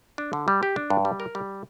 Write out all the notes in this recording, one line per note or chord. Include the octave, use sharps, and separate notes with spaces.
D4
D3
G3
G4
D4
G2
G3
A#4
G3